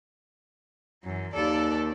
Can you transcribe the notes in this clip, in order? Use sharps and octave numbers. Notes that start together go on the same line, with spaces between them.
F#2 E3
D#2 A4 D5